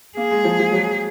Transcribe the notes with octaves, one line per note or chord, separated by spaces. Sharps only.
A#3 G#4
G#3
F3
F3
F#3